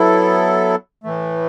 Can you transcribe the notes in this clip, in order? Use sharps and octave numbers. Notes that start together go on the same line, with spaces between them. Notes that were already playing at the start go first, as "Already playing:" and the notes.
Already playing: F#3 B3 E4 A4
A2 E3 A3